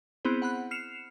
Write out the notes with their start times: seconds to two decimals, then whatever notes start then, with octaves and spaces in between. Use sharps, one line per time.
0.25 B3 C4 E4 G#4 C5
0.42 F#5 B5 F#6
0.71 F6 C7 C#7 E7 F7